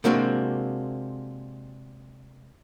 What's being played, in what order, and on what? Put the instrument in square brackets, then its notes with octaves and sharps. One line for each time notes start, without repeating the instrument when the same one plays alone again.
[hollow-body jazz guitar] C3 G#3 A#3 C4 D4 F#4